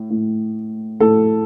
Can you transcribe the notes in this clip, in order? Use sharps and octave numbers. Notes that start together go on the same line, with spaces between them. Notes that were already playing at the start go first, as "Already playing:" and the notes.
Already playing: A2
A2
A2 A4